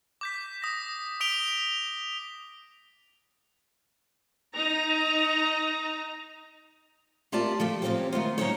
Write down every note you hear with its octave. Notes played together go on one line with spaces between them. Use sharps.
D6 G6 B6
D#6 A#6
D#6 B6 D7 F7 G7
D#4 A#5
A3 F4 G4 A#4 D5 A5
F3 A3 G4
C3 F3 A3 C4 C#4 G4
D#3 A3 B3 F4
F#3 A#3 C#4 D#4 C5 C#5